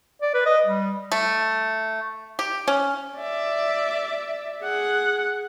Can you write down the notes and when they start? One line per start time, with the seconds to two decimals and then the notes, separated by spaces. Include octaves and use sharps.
0.22 D5
0.34 B4
0.46 D#5
0.66 G3
1.12 A3
2.39 G4
2.68 C#4
3.18 D5 E5
4.63 G#4 F#5